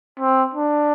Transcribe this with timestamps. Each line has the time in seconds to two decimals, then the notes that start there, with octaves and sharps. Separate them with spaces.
0.20 C4
0.54 D4